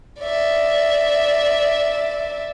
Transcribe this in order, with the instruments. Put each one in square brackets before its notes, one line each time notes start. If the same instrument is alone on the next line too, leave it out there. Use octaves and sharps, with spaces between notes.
[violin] D5 E5